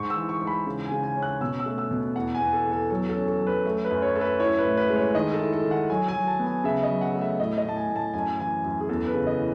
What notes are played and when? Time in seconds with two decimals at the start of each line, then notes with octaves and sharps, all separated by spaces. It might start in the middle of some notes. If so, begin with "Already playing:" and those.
Already playing: G#2 C#6
0.10 E6
0.16 E3
0.29 C#6
0.41 G#2
0.47 B5
0.66 C#3
0.85 G#5
0.91 C#3
1.03 G#5
1.16 C#4
1.22 F#6
1.41 B2 E6
1.60 E6
1.66 A3
1.78 E6
1.91 B2
2.16 E2 F#5
2.35 G#5
2.40 E2
2.53 A4
2.66 E2
2.72 A4
2.90 F#3 A4
3.09 A4
3.15 C#4
3.28 A4
3.40 F#3
3.47 B4
3.65 A3
3.85 B4
3.91 F#2
4.02 C#5
4.15 A3 A4
4.21 B4
4.40 E4 C#5
4.59 B4
4.65 A2
4.77 B4
4.90 G#3
4.96 C#5
5.15 D#3 D#5
5.33 A4
5.40 E4
5.53 A4
5.65 D#3
5.71 F#5
5.90 F#3 G#5
6.08 G#5
6.15 F#3
6.27 A5
6.39 B3
6.46 G#5
6.64 C#3 E5
6.83 D#5
6.90 F#3
7.01 F#5
7.15 A3
7.21 E5
7.39 A2 D#5
7.58 D#5
7.65 A2 A5
7.77 G#5
7.90 A2
7.96 A5
8.14 F#2 G#5
8.40 E3 G#5
8.64 F#2
8.80 G#4
8.89 E2 A4
9.07 B4
9.14 C#3
9.27 D#5
9.39 E3